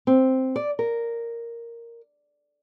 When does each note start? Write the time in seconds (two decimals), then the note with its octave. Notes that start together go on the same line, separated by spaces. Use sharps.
0.07 C4
0.56 D5
0.79 A#4